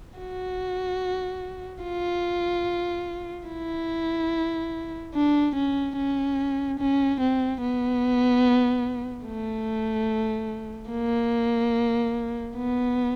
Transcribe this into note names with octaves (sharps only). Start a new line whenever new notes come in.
F#4
F4
E4
D4
C#4
C#4
C#4
C4
B3
A3
A#3
B3